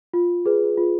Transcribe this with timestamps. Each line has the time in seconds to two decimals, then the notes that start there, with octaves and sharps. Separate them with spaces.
0.13 F4
0.46 G#4 B4
0.77 F4